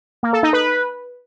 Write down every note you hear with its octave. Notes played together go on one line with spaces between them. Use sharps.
A#3
A4
D#4
B4